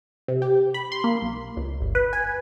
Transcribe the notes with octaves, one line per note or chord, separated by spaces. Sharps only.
C3
G4
B5
C6
A#3
B1
C#2
G1
B4
G#5